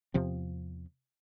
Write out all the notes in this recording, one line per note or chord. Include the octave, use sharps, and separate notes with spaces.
E2 C3 F3 C4